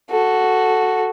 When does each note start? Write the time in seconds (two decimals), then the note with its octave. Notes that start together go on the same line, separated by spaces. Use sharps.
0.10 F#4 A4